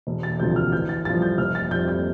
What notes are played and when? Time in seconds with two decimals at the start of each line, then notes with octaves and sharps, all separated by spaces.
0.07 E1
0.23 A6
0.40 D2 C3 F3 G6
0.56 F6
0.72 A1 G6
0.89 A6
1.05 G2 F3 A6
1.22 G6
1.38 F1 F6
1.55 A6
1.71 F2 C3 G3 G6
1.88 G6